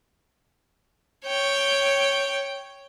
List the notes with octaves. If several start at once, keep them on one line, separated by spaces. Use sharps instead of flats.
C#5 G5